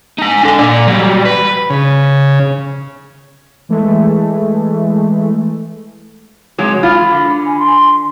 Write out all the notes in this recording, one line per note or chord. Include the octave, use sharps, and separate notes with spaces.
D#4 G#5
D4 A4
A#2 D5
F#3 G3
B4
C#3
E3 G#3 A3
C3 F#3 G#3
F4 B5
D3
G#5
C6